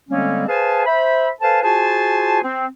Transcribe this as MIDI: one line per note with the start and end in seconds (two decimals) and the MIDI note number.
0.09 0.46 50
0.09 0.46 55
0.09 0.46 56
0.09 0.46 58
0.09 0.46 60
0.09 0.46 61
0.47 0.83 68
0.47 0.83 71
0.47 0.83 72
0.47 0.83 77
0.47 0.83 80
0.47 0.83 81
0.86 1.28 72
0.86 1.28 76
0.86 1.28 83
1.41 1.60 69
1.41 1.60 71
1.41 1.60 72
1.41 1.60 77
1.41 1.60 80
1.41 1.60 81
1.62 2.39 65
1.62 2.39 66
1.62 2.39 68
1.62 2.39 72
1.62 2.39 80
1.62 2.39 81
2.42 2.66 60